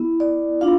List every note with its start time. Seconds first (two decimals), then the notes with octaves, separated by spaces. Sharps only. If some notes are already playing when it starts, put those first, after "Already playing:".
Already playing: B3 E4
0.20 D5
0.61 D4 F4 F5